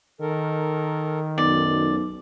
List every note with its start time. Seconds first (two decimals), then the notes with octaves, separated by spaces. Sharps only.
0.21 D#3 A4 A#4
1.38 B1 F#2 D5